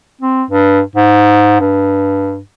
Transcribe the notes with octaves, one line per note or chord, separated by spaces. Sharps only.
C4
G2
G#2
G2